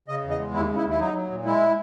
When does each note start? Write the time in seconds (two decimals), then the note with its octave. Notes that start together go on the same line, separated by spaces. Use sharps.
0.08 C#3 D#5
0.23 E2
0.30 D#5
0.39 G#3
0.54 D#2 E4
0.69 C#3
0.77 E4
0.84 D#2
0.90 E4
0.99 F#3 D#4
1.14 F#3
1.30 A#2
1.45 G#3 E4